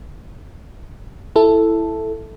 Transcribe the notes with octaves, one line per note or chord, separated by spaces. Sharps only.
E4 A4